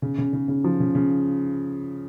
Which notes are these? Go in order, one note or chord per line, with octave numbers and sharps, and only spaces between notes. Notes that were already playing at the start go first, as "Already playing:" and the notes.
C#3
C#3
C#3
C#3
F3
C#3
C#3